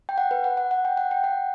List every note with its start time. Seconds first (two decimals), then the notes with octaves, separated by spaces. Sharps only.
0.09 G5
0.18 F#5
0.31 B4
0.44 F#5
0.57 F#5
0.71 F#5
0.85 G5
0.97 F#5
1.11 G5
1.24 F#5